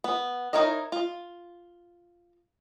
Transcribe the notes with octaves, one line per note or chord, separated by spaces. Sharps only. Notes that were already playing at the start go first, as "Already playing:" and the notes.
B3
D#4 E4 A#4 C#5 D#5
F4